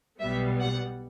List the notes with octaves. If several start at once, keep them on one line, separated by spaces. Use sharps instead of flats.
B1 B2 G3 B3 E5
F#5